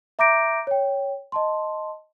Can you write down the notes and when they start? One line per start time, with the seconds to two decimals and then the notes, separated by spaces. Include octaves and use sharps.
0.19 E5 A#5 D6 G6 A#6 D7
0.67 C#5 G5
1.32 D#5 A5 C6